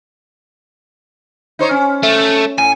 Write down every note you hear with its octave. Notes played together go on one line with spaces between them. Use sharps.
D#4 C5 C#5
C#4
A3
A2 G#5